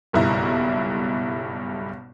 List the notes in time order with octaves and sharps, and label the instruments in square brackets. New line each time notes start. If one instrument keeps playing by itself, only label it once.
[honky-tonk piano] F#1 B1 G2 B2 E4 A#5